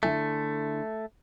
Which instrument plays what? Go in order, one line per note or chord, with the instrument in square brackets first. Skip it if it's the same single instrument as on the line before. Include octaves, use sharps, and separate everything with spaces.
[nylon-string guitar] D3 E4 G#5 [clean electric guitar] A3